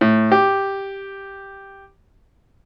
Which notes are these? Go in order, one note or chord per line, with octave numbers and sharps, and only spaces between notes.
A2
G4